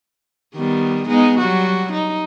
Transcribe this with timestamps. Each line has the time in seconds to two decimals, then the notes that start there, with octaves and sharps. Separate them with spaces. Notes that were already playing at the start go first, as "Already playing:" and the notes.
0.55 D#3 G3 B3
1.08 G#3 B3 D#4
1.39 F#3 G3 F#4
1.93 D#4